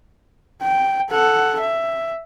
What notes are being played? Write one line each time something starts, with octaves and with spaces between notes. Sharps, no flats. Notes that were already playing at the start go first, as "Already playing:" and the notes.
G5
A4 F#5
E5